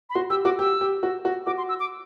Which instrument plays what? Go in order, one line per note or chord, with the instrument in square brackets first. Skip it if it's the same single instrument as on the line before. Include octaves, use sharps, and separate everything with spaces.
[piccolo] B5
[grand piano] F#4 [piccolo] C6
[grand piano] G4 [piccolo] E6
[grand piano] F#4 [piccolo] D6
[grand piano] G4 [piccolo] E6
[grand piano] G4
F#4
F#4
[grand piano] F#4 [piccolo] D6
[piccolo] C6
E6
D6